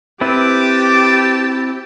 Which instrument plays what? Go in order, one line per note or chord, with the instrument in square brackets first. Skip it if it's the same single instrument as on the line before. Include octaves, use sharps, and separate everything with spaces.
[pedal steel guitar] C4 E4 B4 [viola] G4 [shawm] A5 [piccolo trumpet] D6